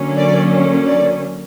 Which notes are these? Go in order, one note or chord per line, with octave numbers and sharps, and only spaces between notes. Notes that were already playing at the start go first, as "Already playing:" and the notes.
Already playing: D3 F#3 A#3 C#4
D5
D5